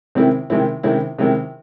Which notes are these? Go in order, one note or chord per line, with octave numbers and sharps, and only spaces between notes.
C3 D#3 G#3 C4 E4
C3 D#3 G#3 C4 E4
C3 D#3 G#3 C4 E4
C3 D#3 G#3 C4 E4